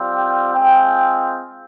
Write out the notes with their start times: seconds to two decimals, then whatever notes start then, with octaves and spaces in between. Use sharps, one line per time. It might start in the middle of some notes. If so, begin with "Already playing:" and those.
Already playing: G3 C4 F4
0.12 G5
0.54 G#3 C4 F4 G5